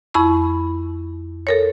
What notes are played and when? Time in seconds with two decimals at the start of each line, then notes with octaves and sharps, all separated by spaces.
0.14 F2 E4 B5 C#6
1.47 A4 A#4 C#5